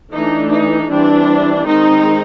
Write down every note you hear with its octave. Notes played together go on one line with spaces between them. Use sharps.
E3 A3 D4 D#4
D#4
E3 G3 C4 D4
D#3 G#3 C4 D#4